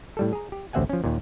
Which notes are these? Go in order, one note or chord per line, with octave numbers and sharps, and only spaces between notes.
A2 G3 A4
G#4 A#5
G4
A1 D2 C4 E5 F#5 G#5
F3 C#4
D#2 A#2